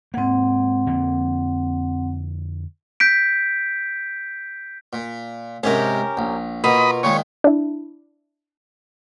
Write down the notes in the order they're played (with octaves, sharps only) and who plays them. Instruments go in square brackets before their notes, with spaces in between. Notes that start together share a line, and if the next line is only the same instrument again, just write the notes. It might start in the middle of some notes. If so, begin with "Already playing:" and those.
[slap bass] G#2 A#3 [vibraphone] C4 F#5
[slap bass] F2 D3 A#3
[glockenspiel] G6 B6 D7
[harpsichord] A#2
[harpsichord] G#2 C3 [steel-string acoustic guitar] C#4 G4 A#4
[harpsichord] A#1
[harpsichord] B2 [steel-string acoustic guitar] A#3 F4 [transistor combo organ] D#5 B5
[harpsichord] A#2 D#3 G#3 [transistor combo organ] C#5
[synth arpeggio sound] D4 E4